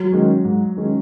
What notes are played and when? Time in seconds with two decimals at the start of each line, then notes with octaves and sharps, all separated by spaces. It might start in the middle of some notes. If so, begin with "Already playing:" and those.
Already playing: F#3
0.12 D#3 G#3 C#4
0.44 G#2
0.77 D#3 G#3 C#4